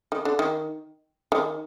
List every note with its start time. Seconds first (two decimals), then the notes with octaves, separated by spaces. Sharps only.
0.12 D#3
0.25 D3
0.39 D#3
1.32 D#3